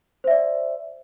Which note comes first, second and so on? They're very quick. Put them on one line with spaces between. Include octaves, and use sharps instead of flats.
C5 E5 D5